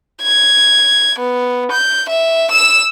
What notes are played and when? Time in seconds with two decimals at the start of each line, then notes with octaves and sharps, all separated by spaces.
0.22 G#6
1.19 B3
1.72 G6
2.09 E5
2.52 E6 E7